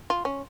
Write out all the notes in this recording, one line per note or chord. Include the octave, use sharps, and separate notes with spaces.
F4
C#4